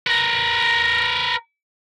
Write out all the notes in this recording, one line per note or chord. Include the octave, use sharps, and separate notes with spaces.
A#4 B4